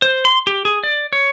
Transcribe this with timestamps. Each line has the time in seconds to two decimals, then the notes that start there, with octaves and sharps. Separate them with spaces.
0.02 C5
0.25 C6
0.47 G4
0.65 G#4
0.83 D5
1.13 C#5